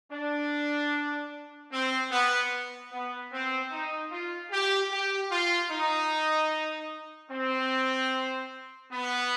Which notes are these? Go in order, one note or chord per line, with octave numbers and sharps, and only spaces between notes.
D4
C4
B3
B3
C4
D#4
F4
G4
G4
F4
D#4
C4
B3